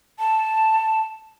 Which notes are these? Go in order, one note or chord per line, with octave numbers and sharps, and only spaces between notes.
A5